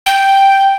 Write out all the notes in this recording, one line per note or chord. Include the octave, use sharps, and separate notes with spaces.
G5